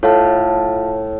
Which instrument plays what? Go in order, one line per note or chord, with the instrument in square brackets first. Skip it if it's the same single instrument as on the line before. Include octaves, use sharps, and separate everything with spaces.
[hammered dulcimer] A2 [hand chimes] F4 F5 A5